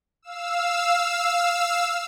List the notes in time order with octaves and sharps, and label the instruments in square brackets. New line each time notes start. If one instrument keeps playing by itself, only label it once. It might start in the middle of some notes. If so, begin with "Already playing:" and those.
[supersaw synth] F5 E6